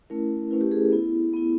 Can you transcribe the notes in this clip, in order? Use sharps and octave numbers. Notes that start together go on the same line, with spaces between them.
A3 C#4 E4 A#4
A3 C#4 E4 B4
G4
G#4
B3 E4
B3 E4